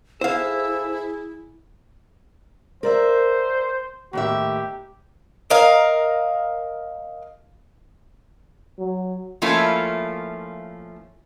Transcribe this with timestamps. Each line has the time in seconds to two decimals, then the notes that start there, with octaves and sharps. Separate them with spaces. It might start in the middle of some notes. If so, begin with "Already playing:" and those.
0.21 G#2 E4 G#4 A4 C5 F5 E6
2.83 A#4 C5 D5 E5
4.13 D#2 A2 G4 E5
5.50 A#4 D#5 F5
8.79 F#3
9.42 F3 A3 A#3 C#4 E4 F4